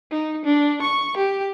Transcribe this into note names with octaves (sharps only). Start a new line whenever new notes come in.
D#4
D4
C#6
G4